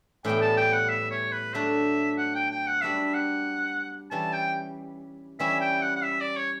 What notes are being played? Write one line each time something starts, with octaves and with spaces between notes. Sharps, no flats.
A2 E3 G3 B3 G5
A5
G5
F#5
E5
C#5
B4
F#3 A3 D4 E5
F#5
G5
G5
F#5
G3 D4 F#4 B4 D5 E5
F#5
E3 G3 C#4 A5
G5
E3 G3 C#4 E4 E5
G5
F#5
F#5
E5
D5
C#5